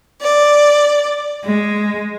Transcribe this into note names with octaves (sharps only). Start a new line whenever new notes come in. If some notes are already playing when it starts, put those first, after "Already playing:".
D5
G#3